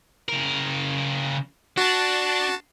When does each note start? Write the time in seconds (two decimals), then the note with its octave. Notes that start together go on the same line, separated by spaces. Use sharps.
0.29 C#3 A#4
1.77 D4 F#4 A5